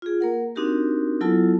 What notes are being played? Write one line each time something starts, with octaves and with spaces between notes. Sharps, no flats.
F4 G#4
A#3 A#4 F#5
C4 D4 D#4 F#4 G4 A#4
F#3 B3 E4 F4 A4 A5